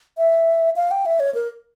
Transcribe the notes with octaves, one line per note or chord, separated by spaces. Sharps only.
E5
F5
G5
E5
C#5
A#4